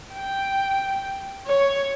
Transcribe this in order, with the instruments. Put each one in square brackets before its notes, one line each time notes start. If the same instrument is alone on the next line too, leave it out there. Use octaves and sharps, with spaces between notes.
[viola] G5
C#5